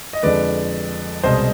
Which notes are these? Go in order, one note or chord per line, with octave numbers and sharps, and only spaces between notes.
D#5
F2 D3 G#3 B4 D5
C2 B2 G#3 C5 D#5